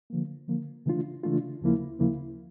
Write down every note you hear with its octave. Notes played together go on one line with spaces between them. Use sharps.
D3 F3 A#3
D3 F3 A#3
C#3 E3 A3 D4 F4
C#3 E3 A3 D4 F4
D2 C#3 F3 A#3 E4
D2 C#3 F3 A#3 E4